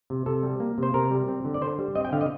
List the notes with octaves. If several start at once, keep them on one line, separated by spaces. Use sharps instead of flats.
C3
C3 A4
G3
A#3
C3 C5
C3 A#4
G3
C4
D3
D5
D3 C5
G3
C4 D#5
G5
D3 F5
D#5